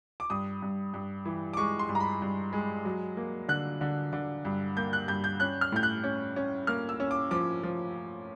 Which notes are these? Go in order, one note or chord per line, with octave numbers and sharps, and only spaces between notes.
D6
G2 D#6
G2
G2
E3
D6
G#3 C#6
C6
G2
A#5
B5
G2
G#3
F#3
A#3
D3 F#6
D3
D3
G2
A#3 G6
F#6
G2 G6
G6
C#4 F#6
F6
A2 G6
F#6
C#4
C#4
A#3 F6
E6
C#4
D6
F3 D6
F3